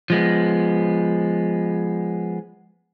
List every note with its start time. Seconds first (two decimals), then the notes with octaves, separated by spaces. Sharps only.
0.10 F3 G#3 B3